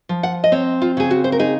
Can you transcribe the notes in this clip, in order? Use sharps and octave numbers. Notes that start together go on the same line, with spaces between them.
F3
F#5
D#5
C4 C#5
F4
C#3 G#4
F#4
C5
A#4
D#4 G#4